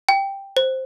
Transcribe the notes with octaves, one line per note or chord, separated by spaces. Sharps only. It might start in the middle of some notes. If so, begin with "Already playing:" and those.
G5
C5